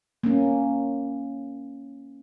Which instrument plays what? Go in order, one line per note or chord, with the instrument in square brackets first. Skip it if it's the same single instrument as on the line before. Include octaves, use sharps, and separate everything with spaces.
[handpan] A#3 C#4